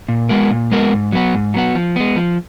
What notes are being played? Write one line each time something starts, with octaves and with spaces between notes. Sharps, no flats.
A#2
G#3 B3 F#4 A#4
A#2
G#3 B3 F#4 A#4
G#2
F#3 B3 F#4
G#2
F#3 B3 F#4
F3
G#3 B3
F3